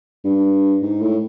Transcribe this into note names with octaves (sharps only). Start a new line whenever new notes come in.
G2
G#2
A2